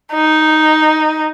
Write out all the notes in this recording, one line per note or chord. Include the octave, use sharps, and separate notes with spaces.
D#4